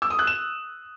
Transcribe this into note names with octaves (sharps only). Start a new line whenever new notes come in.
E6
D#6
F#6
E7